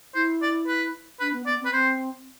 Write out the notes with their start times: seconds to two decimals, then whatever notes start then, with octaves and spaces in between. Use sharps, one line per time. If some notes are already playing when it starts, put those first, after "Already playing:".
0.15 E4 C5
0.42 D5
0.68 B4
1.20 D4 B4
1.33 B3
1.46 B3 D5
1.60 C4
1.65 B4
1.73 C4 C5